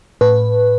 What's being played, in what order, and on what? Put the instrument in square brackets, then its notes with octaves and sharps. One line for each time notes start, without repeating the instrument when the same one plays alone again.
[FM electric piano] A2 B4